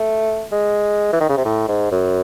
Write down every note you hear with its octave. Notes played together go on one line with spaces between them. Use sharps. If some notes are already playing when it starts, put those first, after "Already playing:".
Already playing: A3
G#3
E3
D#3
C#3
C3
A2
G#2
F#2